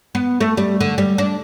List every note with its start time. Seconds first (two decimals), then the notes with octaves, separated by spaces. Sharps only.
0.15 B3
0.41 A3
0.57 G3
0.81 D3
0.98 G3
1.18 D4